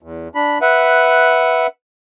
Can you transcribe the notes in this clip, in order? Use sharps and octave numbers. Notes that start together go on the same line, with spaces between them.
E2
D4 B5
B4 E5 F#5